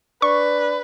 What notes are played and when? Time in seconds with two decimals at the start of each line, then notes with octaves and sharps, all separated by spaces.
0.22 D4 B4 C#6